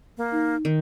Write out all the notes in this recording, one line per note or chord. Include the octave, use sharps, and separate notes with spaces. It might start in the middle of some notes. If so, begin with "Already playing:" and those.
A#3
D#4
D#3